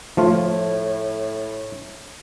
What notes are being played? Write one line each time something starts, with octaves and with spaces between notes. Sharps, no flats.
A2 F3 A3 F4